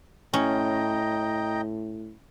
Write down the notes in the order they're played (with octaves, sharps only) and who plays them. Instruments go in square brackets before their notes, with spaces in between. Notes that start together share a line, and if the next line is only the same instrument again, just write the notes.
[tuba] A2 [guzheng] C#4 [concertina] D#5 G5 A#5